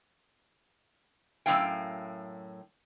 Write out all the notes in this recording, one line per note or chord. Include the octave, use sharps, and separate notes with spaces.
F#2 A2 F3 C#4 F5 G5